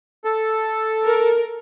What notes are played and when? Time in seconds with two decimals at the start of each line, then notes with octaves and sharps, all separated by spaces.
0.25 A4
1.03 A#4